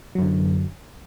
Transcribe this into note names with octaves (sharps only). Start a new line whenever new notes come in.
F#2 D3 F#3